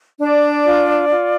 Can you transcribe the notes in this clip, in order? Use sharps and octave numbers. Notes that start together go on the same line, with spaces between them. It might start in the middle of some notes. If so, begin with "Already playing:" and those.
D4 D5
F4
F4